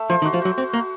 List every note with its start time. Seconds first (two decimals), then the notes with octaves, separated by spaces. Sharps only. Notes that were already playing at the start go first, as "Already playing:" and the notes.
Already playing: A3
0.09 F3 C5
0.22 D#3
0.25 F#4
0.34 F3
0.42 F#3 F#4
0.58 C4 F#4
0.73 A#3 F#4